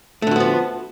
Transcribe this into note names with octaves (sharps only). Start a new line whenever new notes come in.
D3 F3 A3 B3 F#4